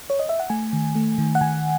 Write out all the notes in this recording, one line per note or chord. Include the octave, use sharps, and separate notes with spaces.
C#5
D#5
E5
F#5
A3 G#5
D#3
A3
D#3
F#5
D#3 G#5